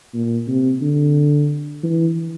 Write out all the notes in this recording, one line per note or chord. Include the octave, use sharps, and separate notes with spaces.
A#2
C3
D3
E3